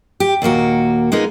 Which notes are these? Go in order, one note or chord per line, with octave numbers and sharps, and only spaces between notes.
G4
D#2 A#2 A#3 F#4
G#3 A#3 B3 D#4 F4